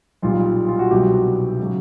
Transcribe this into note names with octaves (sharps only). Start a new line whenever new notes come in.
B1 A#2 G3 F4
F4
F#4
C2 B2 F#3 G4
C#3 F#3